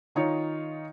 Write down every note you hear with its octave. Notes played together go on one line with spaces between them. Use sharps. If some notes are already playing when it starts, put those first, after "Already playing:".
D#3 D#4 F4 C#5